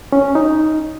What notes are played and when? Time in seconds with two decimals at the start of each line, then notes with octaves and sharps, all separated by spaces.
0.12 C#4
0.35 D#4